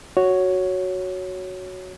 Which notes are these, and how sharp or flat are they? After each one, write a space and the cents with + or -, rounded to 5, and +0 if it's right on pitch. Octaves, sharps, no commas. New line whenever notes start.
F#4 +0 C#5 +0